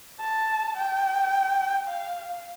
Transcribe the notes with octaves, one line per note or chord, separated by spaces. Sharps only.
A5
G5
F5